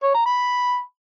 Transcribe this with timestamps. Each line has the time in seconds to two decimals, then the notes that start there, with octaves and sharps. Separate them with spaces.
0.03 C#5
0.15 A#5
0.26 B5